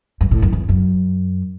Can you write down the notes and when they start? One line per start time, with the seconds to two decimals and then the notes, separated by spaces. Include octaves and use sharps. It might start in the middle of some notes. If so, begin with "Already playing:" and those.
0.21 G2
0.31 A2
0.42 F#2
0.52 E2
0.69 F#2